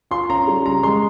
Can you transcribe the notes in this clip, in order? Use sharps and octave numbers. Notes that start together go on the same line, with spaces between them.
F4 C6
C#4 A#5
G3
C#3 A#5
G#3 C6